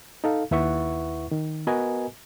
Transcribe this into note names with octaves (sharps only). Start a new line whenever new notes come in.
D#4 A4 F5
D#2 E4 B4 E5 F#5 C#6
D#3
B3 F#4 A#4 B4 D#5 G#5